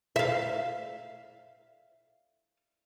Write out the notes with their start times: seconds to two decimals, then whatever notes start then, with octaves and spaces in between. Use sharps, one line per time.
0.16 E5 F5